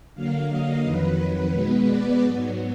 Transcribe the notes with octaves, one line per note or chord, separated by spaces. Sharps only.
D3 F#3 A#3 F5
D#5
F2 D#3 F#3 B4
B2 G#3 B3 B4
D5
G#2 F#3 B3